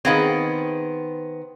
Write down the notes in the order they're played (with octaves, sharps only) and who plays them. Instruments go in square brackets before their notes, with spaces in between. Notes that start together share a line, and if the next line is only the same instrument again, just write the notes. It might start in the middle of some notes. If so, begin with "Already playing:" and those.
[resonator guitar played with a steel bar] D#3 B3 C4 [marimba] G#4 F5 G#6